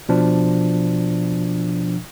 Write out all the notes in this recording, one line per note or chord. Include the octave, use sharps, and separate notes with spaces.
B2 F3 D4